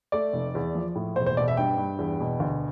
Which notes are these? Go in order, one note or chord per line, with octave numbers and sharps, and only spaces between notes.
A3 D5
F1
E2
F3
A2
E1 C5
C5
B2 D5
E5
G2 G5
G2
E2
B2
D2